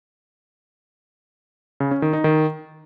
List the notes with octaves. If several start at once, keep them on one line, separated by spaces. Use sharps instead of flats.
C#3
C#4
D#3
D#4
D#3